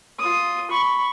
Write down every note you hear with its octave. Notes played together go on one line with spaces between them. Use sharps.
F4 D#6
B5 C#6